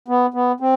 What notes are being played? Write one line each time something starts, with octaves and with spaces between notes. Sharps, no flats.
B3
B3
C4